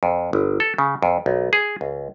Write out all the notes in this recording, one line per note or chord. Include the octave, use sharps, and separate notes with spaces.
F2
G1
A4
C#3
F2
B1
G#4
C#2